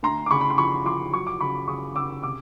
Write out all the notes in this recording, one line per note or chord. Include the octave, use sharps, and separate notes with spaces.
D2 A#5 C6
D6
C#3 B5 C#6
B5
C6
F3 B5 C#6
F3 C6 D6
F#3 C#6
D6
C#3 B5 C#6
C#3 C#6 D#6
C#3 D6 E6
C3 D6 E6